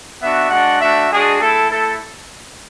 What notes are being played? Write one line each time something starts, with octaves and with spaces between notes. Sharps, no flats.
B3 D4 F#4 E5
G#3 D4 F#4 F#5
A3 D4 F#4 E5
G#3 D4 F#4 G#4
A3 E4 A4
A3 E4 A4